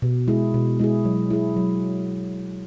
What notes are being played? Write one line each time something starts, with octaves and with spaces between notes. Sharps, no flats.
B2
G#3 E4 G#4
B2
G#3 E4 G#4
F#3
E4 G#4
F#3